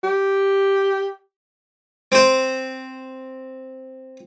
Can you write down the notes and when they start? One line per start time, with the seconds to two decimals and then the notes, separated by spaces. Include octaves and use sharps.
0.03 G4
2.12 C4 C5